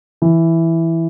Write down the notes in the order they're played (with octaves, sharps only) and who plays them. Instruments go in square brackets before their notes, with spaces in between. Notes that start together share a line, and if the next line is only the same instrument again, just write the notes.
[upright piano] E3